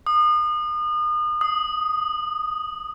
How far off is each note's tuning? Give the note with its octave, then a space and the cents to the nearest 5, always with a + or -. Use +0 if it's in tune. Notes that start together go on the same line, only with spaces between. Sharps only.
D#6 -35
D#6 +0